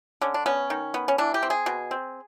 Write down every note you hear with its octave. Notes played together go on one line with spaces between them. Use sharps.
D3 C#4
D4
B3 C#4
D#3
B3
C#4
E3 D4
G4
C4
G#4
B2
C4